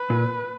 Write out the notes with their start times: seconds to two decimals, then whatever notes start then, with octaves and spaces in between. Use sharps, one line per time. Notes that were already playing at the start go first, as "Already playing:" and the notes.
Already playing: B4
0.10 A#2